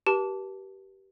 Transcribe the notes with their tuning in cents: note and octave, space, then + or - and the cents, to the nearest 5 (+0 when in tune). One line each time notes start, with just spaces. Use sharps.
G4 -20 B4 -45 A5 +0